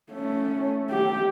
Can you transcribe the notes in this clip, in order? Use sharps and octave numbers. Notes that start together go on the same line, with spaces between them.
A3 C#4
G4